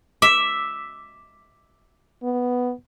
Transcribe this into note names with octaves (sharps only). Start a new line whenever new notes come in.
E5 D6
B3